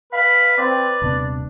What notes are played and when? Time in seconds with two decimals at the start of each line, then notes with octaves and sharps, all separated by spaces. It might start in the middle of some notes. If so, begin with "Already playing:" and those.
0.13 B4 F5 B5
0.58 C4 D5
1.02 D#1 C3 B3 D4